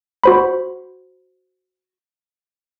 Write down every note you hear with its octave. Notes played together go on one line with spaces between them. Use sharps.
F#4 C5 B5